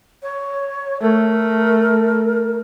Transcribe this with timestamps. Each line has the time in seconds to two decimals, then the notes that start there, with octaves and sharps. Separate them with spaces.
0.23 C#5
1.02 A3 A#4